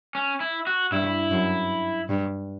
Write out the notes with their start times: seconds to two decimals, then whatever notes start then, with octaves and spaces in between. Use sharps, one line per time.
0.15 C#4
0.40 E4
0.67 F#4
0.92 G2 E4
1.31 F#2
2.09 G2